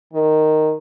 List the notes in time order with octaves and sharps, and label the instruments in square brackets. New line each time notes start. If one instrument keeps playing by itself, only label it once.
[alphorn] D#3